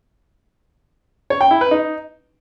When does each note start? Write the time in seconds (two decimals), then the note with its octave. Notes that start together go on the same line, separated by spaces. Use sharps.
1.30 C#5
1.41 G5
1.51 E4
1.61 B4
1.71 D#4